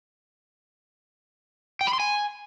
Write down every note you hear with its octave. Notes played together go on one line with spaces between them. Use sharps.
G5
B5
C6
G#5